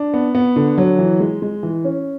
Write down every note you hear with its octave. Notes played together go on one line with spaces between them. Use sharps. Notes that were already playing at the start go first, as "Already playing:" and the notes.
Already playing: D4
B3
B3
D3
F#3
E3
G#3
G#3
E3
C#4